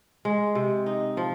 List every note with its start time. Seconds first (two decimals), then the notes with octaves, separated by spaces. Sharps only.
0.25 G#3
0.55 C3
0.86 D#4
1.17 F3